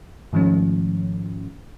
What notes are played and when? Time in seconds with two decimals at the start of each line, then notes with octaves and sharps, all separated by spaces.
0.33 G#2 D#3 F3 A3 C#4